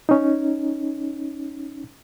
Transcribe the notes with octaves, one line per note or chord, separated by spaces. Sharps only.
C#4 D#4